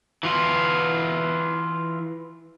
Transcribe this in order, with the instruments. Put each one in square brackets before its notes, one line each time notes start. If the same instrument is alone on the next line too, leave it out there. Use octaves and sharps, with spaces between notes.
[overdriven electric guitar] E3 F4